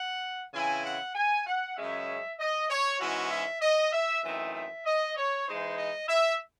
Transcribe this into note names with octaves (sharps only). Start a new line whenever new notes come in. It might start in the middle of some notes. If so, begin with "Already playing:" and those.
Already playing: F#5
C#3 E3 C4 E4 G#5
F#5
G#5
F#5
F#2 C#3 G#3 C#4 E5
D#5
C#5
G#2 E3 G#3 C#4 E4 F#4
E5
D#5
E5
F#2 E3 A3 C4 D#4 E5
E5
D#5
C#5
E3 G#3 D#4 C5
D#5
E5